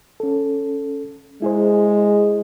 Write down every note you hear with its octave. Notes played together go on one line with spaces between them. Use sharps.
C#4 A4
G#3 E4 G#4 C5